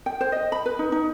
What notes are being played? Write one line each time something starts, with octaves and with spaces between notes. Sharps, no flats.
G5
C5
D#5
B5
B4
D#4
D#4